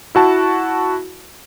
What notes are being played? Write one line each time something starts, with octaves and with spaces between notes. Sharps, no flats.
E4 F#4 A5